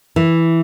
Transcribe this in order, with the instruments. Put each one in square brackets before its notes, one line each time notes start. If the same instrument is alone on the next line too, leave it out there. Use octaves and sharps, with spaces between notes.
[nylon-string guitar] E3